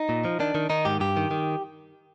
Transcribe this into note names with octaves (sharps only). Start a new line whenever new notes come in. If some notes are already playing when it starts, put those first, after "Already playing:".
Already playing: D#4
A#2
F3
D#3 D4
D#3
D#3 D#4
G#2 G4
G2 G4
D#3
D#3